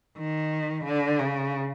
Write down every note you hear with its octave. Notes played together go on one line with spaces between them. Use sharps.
D#3
D3
C#3